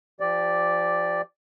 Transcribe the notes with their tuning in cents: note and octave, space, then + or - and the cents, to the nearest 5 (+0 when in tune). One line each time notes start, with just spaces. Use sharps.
F3 -25 G4 +0 D5 +0